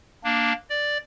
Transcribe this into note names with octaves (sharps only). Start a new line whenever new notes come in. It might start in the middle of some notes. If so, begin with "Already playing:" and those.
A#3 D4
D5